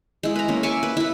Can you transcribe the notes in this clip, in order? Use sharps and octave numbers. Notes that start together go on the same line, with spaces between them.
G#3 E4
B4 A#5
A#3 C#4
E5 G#5 C#6 D6
B4
E4 B4